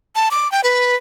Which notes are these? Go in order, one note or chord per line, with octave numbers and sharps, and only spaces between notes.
A5
D6
G5
B4